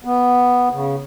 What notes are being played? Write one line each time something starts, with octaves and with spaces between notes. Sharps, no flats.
B3
C#3